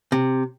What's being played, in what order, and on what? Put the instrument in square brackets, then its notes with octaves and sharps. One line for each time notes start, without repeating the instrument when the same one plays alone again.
[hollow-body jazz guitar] C3